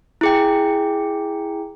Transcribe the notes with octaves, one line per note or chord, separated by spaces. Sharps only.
E4 G#4 G5